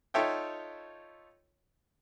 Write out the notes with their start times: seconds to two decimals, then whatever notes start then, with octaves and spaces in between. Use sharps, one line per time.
0.14 D#4 F4 A4 C#5 E5 G5